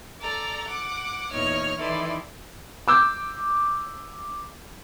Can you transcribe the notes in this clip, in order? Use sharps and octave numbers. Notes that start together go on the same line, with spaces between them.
A4 D5 A#5
F#5 D6
E2 A#2 D#4 C#5 F6
D#3 E3 E4 A4 D5 C6
D6 E6 G6